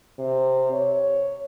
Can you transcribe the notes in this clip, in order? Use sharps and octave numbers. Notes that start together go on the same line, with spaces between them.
C3
C#5